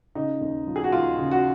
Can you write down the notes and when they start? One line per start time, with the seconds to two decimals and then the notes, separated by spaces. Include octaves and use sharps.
0.15 C#3 D#4
0.41 D#2
0.67 F3
0.76 G#4
0.84 F#4
0.92 D#2 F4
1.18 C#3
1.31 F#4